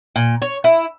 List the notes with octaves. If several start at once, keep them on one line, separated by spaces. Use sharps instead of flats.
A#2
C#5
E4